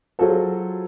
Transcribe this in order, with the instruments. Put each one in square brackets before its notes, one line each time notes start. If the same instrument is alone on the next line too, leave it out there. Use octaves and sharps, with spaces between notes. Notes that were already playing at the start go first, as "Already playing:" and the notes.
[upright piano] F#3 F4 F#4 G#4 A4 C5